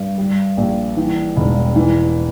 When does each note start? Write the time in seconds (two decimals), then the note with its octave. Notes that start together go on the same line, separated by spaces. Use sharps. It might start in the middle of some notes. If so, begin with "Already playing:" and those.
Already playing: G2
0.18 G3
0.57 A#1
0.97 E3
1.36 E1
1.76 E3